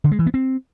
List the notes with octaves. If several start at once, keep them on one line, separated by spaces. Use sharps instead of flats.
D3
G#3
E3
B3
C4